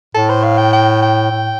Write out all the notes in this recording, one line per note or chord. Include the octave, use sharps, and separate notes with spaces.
A2 A4
C5
F5
G5
G5
G5
A2